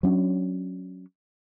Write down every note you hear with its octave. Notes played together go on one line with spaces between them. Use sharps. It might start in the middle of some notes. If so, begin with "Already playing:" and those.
F#3 C#4 D4